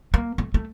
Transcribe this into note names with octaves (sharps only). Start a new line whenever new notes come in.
A#3
A3
A3